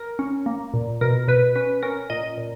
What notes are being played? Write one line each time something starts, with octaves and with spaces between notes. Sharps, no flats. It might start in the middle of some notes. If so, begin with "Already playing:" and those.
Already playing: A#4
C#4
A#3
A#2
B2 A#4
B2 B4
C#4 B4
C#4 A#4
A#2 D#5
A#2